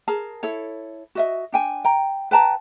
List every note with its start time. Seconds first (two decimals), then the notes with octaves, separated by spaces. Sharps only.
0.08 G#4 A#4 A5
0.43 E4 A4 C#5
1.15 F#4 D#5 E5
1.52 D4 G5 G#5
1.85 G5 A#5
2.31 B4 G5 A5 A#5